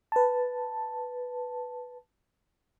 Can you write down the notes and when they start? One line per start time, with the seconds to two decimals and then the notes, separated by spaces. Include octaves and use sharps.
0.12 B4 A5